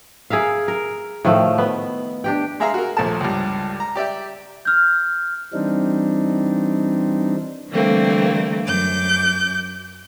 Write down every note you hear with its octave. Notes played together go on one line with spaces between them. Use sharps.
G#4 A#4 E5 F5
A#4
A2 D#3 F3 A3
B3
D4 G4 G5
G#3 G#4 E5 F5 A#5
F#4 A#4
A#1 D#2 A3 A5
C#2 G2
A#5
G4 D5 E5 G5
F6 G6
E3 G3 C4 D4 D#4
D3 E3 G3 A3 A#3 C4
F#2 D6 G6